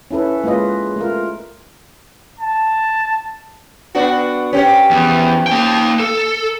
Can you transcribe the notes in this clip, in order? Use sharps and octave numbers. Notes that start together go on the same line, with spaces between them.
C#4 E4 A4 B4
G#3 A#3 F4 B4 D#5
A3 F4 A#4
A5
B3 D4 F#4
C#4 G4 C5
E2
A#3 G5
A4